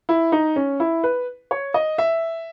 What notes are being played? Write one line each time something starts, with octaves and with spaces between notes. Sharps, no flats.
E4
D#4
C#4
E4
B4
C#5
D#5
E5